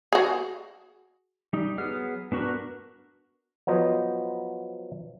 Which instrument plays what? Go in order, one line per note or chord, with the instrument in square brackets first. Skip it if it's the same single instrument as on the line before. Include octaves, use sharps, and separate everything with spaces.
[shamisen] F#4 G#4
[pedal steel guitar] G3 D#4
F#3 B3 G#4 F6
B3 D4 F#4 A#4 B4
[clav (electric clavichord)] F3 F#3 B3 C5 D#5